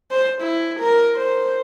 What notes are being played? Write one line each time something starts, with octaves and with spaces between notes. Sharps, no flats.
C5
E4
A#4
C5